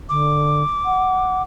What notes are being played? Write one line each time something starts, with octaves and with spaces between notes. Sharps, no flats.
D3 D6
F#5